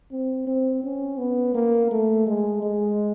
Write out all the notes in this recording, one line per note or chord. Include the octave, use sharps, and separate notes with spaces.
C4
C4
C#4
B3
A#3
A3
G#3
G#3